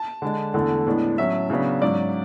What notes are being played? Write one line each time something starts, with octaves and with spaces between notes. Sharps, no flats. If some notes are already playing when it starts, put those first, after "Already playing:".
Already playing: A5
D3 G#3 D4
E2 D3 A3
A2 G#3 B3 D4
A2 F#3 C#4 E5
C#3 F#3 B3 D4
G#2 F#3 C#4 D5